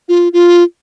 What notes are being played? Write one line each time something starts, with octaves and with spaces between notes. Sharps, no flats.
F4
F4